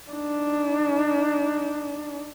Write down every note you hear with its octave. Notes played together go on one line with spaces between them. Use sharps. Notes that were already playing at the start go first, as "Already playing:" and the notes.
D4 D#4